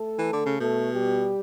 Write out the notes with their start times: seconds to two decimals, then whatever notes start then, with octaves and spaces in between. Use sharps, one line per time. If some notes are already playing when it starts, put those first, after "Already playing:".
Already playing: A3 A4
0.18 E3
0.33 D3
0.46 C#3
0.60 B2 A3 A4
0.93 G3 G4